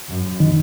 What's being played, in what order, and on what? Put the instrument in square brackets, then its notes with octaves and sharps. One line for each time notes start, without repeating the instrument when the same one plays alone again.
[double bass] F#2
[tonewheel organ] D#3